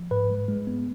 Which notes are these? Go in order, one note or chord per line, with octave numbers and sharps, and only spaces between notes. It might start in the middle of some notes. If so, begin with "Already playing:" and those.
Already playing: F3
G#2 B4
G#3
G#3
B3